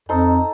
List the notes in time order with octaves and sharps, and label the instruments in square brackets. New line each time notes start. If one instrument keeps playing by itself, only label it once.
[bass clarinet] F2 [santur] D#4 A4 C5